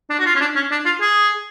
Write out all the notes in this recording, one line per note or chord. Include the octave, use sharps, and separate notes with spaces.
D4
F#4
F4
C#4
D4
C#4
D4
F4
G#4